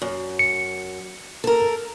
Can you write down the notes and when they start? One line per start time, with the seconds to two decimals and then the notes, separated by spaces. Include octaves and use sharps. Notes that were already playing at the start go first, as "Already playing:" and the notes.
0.02 F#2
0.39 C#7
1.44 A4 A#4